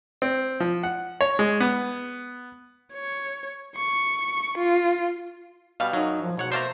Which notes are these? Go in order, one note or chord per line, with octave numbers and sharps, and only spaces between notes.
C4
F3
F#5
C#5
G#3
B3
C#5
C#6
F4
B2 G3 F5
F#2 F#3 D#4
F3
G#2 B2 C#5 F#5
A3 A#3 C5 D5 A5 A#5